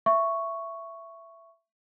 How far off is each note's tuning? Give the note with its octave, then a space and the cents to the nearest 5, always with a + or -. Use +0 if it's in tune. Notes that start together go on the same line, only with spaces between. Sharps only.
E5 +15 C#6 +0